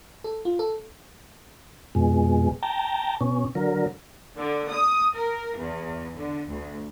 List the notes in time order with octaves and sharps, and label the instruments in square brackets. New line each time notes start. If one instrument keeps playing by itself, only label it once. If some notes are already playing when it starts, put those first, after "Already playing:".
[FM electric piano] A4
F4
A4
[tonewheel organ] F2 B2 G#3
G5 A5 A#5
B2 C#4
D3 F#3 A#4
[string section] D3
D#6
A#4
E2
D3
D2